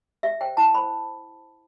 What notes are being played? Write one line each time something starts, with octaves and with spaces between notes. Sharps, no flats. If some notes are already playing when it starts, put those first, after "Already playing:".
G4 E5
C5 G5
E4 A5
C5 B5